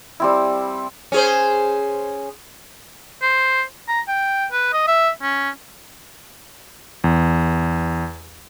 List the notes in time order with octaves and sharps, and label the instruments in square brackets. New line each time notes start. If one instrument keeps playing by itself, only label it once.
[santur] G3 C4 E4
[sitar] C#4 G#4 C5
[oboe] C5
A#5
G5
B4
D#5
E5
C#4
[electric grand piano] E2